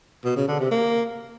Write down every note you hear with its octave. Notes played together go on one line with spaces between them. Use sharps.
B2
C#3
D3
C3
A#3